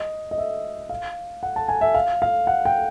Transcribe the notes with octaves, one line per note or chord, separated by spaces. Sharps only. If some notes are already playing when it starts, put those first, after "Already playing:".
Already playing: D#5
D#5
E5
F5
F#5
A5
G#5
E5
F5
F5
F#5
G5